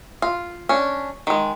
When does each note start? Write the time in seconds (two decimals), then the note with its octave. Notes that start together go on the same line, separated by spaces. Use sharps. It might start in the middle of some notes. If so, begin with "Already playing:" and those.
0.22 F4
0.69 C#4 D4
1.27 D#3 G#3